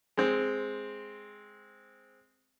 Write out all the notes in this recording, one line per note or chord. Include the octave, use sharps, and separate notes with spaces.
G#3 C4